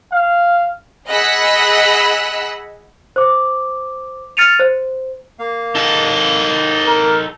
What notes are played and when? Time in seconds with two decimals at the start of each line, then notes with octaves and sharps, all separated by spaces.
0.12 F5
1.08 G#4 D#5 F#5 B5 E6 F#6
3.16 C5 D6
4.37 F6 A6 C#7 D#7 F7
4.59 C5
5.39 A#3 F5
5.75 D#4 A4
6.87 A#4